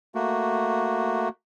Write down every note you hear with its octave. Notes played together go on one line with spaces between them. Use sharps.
A3 A#3 F#4